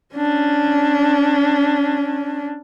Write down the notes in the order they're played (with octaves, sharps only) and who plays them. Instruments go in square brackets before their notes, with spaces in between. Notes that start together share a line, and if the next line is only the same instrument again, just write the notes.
[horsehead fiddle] C#4 D4